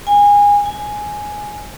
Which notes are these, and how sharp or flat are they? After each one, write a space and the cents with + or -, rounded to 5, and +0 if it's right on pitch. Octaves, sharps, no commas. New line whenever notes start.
G#5 -25
G#5 +5